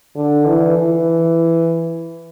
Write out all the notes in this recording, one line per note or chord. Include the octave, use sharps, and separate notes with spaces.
D3
E3
E3